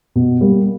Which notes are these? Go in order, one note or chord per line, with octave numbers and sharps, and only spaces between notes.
B2
G3 A#3